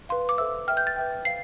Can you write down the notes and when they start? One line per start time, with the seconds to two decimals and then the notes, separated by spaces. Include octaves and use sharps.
0.09 B4 F5 C6
0.29 D6
0.38 A4 C5 E5 E6
0.68 B4 E5 G5 F6
0.77 G6
0.87 A6
0.96 B4 E5 G5
1.25 C5 F5 C7